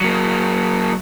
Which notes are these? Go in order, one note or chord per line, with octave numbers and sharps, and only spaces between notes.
F#3 A#3